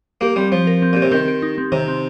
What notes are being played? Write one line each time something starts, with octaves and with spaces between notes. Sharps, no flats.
A#3 G4
G3 C4
F3 C4
A#4
C4
A#2 G4
C3
D#3 C4
G4
D#4
C4
C3 D#3
C4